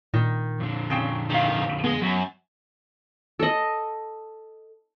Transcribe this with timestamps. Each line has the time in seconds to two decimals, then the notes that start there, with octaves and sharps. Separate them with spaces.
0.14 A#2 D#3
0.60 F2 D3
0.90 C#3 C4 G5
1.30 C3 D#3 G4 F5
1.84 G#3 B3 D#5
2.02 F#2 F#3
3.39 A4 D#5